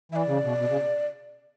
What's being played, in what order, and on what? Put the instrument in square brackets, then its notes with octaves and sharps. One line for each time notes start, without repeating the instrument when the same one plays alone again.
[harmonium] E3 [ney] E5
[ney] D5
[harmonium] C#3
B2
B2
C#3